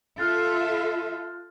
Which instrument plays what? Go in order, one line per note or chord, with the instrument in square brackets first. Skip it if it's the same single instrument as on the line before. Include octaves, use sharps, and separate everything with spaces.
[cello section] F4 A4 E5 [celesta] F6 F#6 A6